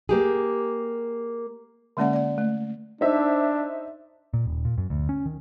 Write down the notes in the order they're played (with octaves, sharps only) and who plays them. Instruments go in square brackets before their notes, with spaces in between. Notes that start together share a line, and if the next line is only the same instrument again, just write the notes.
[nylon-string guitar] A#3 G4 G#4
[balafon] D3 G#3 A#3 C#4 D5 F#5
D5 F#5
A3
[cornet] D4 [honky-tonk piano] D#4 C5 E5
[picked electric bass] A#2
D#1
A#2
F#2
D2
C#4
D#3